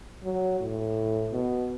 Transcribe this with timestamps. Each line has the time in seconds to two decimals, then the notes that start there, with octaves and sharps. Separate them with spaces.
0.24 F#3
0.60 A2
1.32 B2